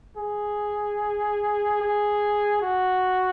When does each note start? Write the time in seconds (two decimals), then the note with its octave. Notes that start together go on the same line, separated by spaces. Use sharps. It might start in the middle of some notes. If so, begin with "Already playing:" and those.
0.17 G#4
1.81 G#4
2.62 F#4